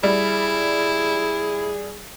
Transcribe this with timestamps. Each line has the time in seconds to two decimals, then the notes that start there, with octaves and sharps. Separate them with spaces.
0.03 G3 E4 G#4